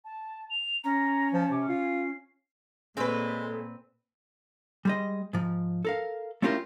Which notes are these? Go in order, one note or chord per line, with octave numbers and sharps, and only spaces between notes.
A5
F7
C#4 A#5
F3 A5
C3 D6
F4 C7
A#2 G#3 C4 G#4 A4 B4 C#5
G3 G#3 D#5
G#2 F3
A4 A#4 F5
A3 C#4 E4 F4 G4 A#4